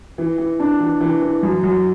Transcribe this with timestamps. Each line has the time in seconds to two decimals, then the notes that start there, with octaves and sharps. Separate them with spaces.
0.18 E3
0.38 E3
0.60 D4
0.80 E3
1.01 E3
1.22 E3
1.43 F#2
1.63 F#2